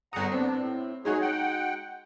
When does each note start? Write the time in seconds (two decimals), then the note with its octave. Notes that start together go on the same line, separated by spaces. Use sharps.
0.13 G1 F#5 A#5 D#6
0.32 B3 C4 D4
0.57 A2
1.05 F#3 G#3 D#4 F#4 G#4 C#5
1.21 F#5 G5